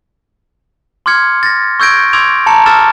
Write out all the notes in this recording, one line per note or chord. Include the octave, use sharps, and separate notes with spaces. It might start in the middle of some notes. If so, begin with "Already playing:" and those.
C6 D6 F6 G#6 C#7
A6 A#6
C#6 E6 G6 G#6 A#6 D7
C6 D6 E6 G#6 D7 F7
A5 A#5 C#7
D6 E6 F6 A6 E7